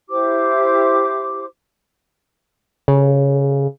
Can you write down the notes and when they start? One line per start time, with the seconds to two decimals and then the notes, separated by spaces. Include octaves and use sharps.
0.09 E4 G4 C5 D6
2.88 C#3